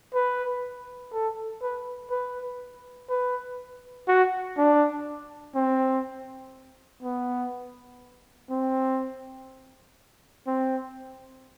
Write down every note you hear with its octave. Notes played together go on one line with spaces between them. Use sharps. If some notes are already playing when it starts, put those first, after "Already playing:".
B4
A4
B4
B4
B4
F#4
D4
C4
B3
C4
C4